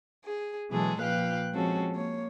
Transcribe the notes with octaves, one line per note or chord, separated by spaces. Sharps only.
G#4
B2 E3 F#3 G#3 G#4 A4
A#2 F3 B4 F5 G5 F#6
F3 G#3 C4 C#4 F#4 A4
A#3 C#5